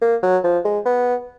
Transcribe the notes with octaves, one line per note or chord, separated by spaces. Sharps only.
A#3
F#3
F3
G#3
B3